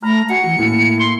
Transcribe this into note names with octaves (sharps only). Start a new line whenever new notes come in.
A3 A#5 B5 F6
F#4 F#5 G#5 C7 C#7
E3
A2 A#3
C6